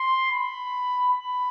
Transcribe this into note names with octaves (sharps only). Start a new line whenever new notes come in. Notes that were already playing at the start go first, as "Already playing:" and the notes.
Already playing: C6
B5
B5